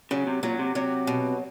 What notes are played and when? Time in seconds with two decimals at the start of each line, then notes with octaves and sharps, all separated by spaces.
0.11 C#3 F#3
0.27 C3
0.43 A#2 F#3
0.59 C3
0.75 C3 F#3
1.07 B2